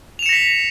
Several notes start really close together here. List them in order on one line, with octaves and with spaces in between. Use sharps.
F7 E7 C#7 A#6 B6